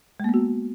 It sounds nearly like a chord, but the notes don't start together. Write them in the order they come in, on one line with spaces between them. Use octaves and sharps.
G#3 A#3 B3 F#4